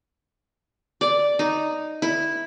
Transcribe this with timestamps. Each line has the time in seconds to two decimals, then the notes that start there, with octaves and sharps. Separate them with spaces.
1.01 D5
1.39 D#4
2.02 E4